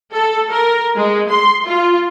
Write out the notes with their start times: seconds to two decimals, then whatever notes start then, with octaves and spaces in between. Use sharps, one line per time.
0.14 A4
0.51 A#4
0.96 G#3
1.30 C6
1.66 F4